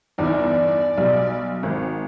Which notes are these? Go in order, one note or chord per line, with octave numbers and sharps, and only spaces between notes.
G1 E2 D#4 D5
B1 G3
G#1